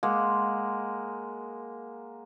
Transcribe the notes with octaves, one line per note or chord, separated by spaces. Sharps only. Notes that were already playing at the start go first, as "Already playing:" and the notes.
G#3 A#3 F#5